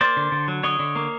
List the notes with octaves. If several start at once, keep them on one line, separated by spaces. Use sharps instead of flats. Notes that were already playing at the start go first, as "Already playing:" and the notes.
A#3 C5 D5
D3
D3
F#3
D3 C#5 D#5
D3
A#3